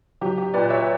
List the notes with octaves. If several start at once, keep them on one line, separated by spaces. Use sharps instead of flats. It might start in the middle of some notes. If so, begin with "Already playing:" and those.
F#3 G4
G4
A#2 B4 D5
C#5 E5